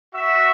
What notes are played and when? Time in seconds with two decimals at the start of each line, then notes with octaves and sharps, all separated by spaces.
0.14 F#4 E5